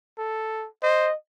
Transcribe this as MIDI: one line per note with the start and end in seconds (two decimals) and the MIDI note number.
0.18 0.67 69
0.83 1.10 72
0.83 1.14 75